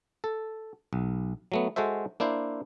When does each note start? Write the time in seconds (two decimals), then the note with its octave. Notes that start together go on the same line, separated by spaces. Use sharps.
0.24 A4
0.93 B1
1.52 F#3 A3 B3
1.76 G#3 F#4 A4 C5 E5
2.20 A#3 D4 E4 C5